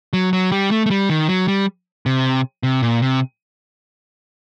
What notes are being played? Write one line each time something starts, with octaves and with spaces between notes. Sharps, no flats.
F#3
F#3
G3
A3
A3
G3
D#3
F#3
G3
C3
C3
A#2
C3